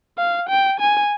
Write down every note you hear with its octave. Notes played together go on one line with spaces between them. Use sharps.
F5
G5
G#5